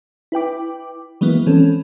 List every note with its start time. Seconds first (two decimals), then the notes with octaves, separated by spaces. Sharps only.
0.32 E4 B4 G5 D6
1.21 E3 F#3 G#3 A#3 B3 E4
1.46 E3 C4 C#4 A4